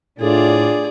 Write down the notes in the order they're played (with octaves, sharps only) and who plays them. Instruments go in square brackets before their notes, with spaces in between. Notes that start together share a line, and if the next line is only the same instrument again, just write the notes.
[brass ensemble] A2 [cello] D4 F4 [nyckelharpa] G#4 D5